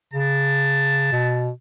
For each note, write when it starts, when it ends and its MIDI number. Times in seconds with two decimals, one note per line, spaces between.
0.14 1.10 49
0.14 1.42 81
1.12 1.50 47